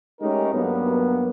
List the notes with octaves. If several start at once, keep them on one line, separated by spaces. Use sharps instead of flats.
G#3 A3 C#4 D#4 G4 A#4
G2 F#3 A#3 B3